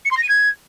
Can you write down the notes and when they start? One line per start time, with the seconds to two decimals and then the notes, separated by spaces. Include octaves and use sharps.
0.05 C#7
0.11 C6
0.17 A#6
0.23 D#7
0.29 G#6